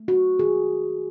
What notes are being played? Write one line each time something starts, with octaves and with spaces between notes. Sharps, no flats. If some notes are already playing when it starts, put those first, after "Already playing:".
Already playing: A3
F#4
D#3 G#4